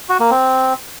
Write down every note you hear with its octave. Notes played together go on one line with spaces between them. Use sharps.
F#4
A#3
C4